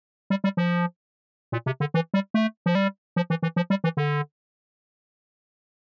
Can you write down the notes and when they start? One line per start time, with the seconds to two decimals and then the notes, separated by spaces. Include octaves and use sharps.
0.30 G3
0.44 G3
0.57 F3
1.52 A#2
1.66 C3
1.80 D3
1.94 E3
2.14 G3
2.34 A3
2.66 F3
2.75 G3
3.16 F3
3.30 E3
3.43 E3
3.56 F3
3.70 G3
3.84 E3
3.97 D3